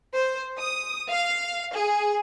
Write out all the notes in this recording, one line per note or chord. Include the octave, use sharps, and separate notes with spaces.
C5
D#6
F5
G#4